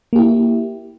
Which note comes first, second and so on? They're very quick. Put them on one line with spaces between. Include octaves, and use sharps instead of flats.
A#3 G4 E4